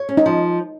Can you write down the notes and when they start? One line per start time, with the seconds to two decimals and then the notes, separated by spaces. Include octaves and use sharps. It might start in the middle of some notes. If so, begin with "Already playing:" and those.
Already playing: C#5
0.09 C#4
0.17 D#4
0.26 F3